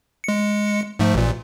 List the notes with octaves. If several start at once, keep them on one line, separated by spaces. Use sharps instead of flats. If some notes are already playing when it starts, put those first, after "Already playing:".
G#3 C#7
G#2 F3 A3
A1 A#2